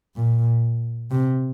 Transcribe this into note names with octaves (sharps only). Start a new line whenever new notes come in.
A#2
C3